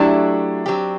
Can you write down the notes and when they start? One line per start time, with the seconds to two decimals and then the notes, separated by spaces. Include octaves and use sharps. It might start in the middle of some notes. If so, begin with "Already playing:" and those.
Already playing: F#3 A3 D4 E4 G4
0.66 F#3 C4 G4